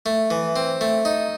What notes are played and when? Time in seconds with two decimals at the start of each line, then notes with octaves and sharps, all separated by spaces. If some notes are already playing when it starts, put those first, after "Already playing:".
0.06 A3
0.30 E3
0.56 C4
0.81 A3
1.05 D#4